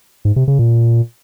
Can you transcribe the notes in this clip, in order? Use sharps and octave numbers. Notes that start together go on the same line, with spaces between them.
G#2
C3
C#3
A#2